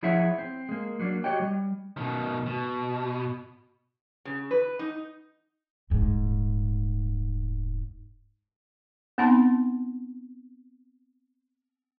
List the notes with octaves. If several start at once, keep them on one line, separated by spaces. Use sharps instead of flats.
F3 E4 G#4 C#5 E5 F#5
C4
G#3 A#3
F#3 A#3 D4
F#4 G4 C#5 D#5 G5
G3
B2 D#3
B2
C#3
B4
D#4
D#1 G#2
B3 C4 D#4 F#5 A5 C6